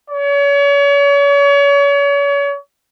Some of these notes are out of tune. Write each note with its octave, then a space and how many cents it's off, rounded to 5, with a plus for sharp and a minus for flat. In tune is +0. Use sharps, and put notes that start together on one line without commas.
C#5 +35